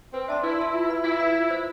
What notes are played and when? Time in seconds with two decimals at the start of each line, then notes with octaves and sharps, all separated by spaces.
0.13 C4 B4
0.28 D4 E5 A5 C6
0.44 E4 B4
0.59 E5 A5 C6
0.74 F4
0.89 B4 F5 B5
1.04 E4 F4
1.20 B4 F5 B5
1.35 F4
1.50 C5 E5 B5